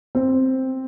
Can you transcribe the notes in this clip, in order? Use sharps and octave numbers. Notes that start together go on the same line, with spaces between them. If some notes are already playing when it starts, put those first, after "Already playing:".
C4